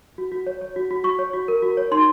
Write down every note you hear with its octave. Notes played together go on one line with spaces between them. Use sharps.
F#4
F#4
C#5
C#5
F#4
F#4
F#4 C#6
C#5
F#4
A#4
F#4
C#5
D#4 C6